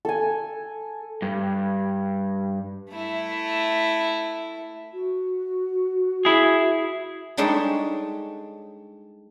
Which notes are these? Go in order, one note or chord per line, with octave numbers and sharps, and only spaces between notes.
A4 G#5
G2
A3 E4
F#4
E4 G#4
G3 G#3 D4 D#4 A4 C#5